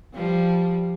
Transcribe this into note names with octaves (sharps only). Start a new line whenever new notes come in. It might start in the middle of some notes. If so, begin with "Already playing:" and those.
F3 G3